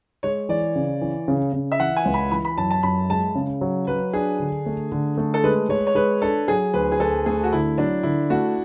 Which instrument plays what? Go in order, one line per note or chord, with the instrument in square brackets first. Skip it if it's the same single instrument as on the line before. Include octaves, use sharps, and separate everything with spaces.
[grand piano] G#3 [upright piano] C#5
[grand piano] E3 [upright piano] D5
[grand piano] C#3
E3
C#3
C#3
[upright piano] E5
[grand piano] E3 [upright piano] F#5
[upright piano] G#5
[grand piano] C#2
[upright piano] B5
[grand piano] E3 [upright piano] B5
[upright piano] B5
[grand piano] F#2 [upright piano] A5
[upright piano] A5
[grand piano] F#2 [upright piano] B5
[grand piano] G#3 [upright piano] A5
[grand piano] C#3
F#3
[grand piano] F#3 [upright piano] B4
[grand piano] D4 [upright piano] G#4
[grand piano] D3
A3
D3
A3
[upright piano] A4
[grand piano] G#3 [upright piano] B4
[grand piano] G#3 [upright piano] C#5
[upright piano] C#5
[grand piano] G#3 [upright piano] B4
[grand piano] D4 [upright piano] A4
[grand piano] F#3 [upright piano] G#4
[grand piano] D2 [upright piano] B4
[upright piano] G#4
[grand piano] D2 [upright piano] A4
[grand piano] A3 [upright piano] G#4
[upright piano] F#4
[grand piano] D3 [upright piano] E4
[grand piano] F#3 [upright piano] D4
[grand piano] D3 [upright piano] E4
[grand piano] A3 [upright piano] F#4